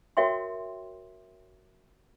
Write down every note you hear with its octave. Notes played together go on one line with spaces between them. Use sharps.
F#4 A#4 C#5 E5 G5 C6